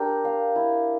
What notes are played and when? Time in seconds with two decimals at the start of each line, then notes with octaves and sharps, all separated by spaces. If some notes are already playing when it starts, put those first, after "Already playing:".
Already playing: D4 G4 A#4
0.25 F5
0.56 E4